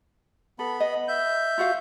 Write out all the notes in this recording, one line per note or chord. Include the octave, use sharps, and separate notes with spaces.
B3 A4 B5
D#5
E5 G6
F4 F#4 F5